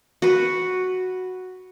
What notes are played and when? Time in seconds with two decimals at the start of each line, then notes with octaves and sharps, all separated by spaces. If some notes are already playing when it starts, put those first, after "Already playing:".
0.22 F#4 B4